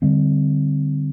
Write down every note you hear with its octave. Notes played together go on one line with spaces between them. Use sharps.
D3 G3 C4